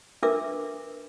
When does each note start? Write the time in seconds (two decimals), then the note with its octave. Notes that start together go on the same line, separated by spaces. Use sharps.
0.23 D4 A#4 B4 E5 D6